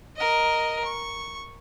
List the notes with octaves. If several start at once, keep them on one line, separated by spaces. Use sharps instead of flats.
A#4 D#5
C#6